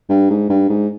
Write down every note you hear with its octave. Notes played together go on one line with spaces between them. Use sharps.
G2
G#2
G2
G#2